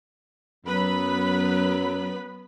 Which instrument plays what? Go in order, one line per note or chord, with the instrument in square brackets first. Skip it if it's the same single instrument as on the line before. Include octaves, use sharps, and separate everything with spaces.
[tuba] F#2 [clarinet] F#3 [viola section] B3 B4 B5